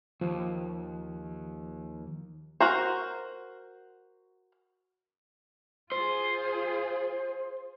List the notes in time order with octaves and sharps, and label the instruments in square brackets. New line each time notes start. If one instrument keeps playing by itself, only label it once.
[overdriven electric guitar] D#2 [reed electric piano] F3
[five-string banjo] F#4 A#4 C5
[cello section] F4 G#4 [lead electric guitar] C5